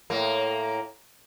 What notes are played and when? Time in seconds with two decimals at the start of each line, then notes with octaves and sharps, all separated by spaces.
0.10 A2 A#3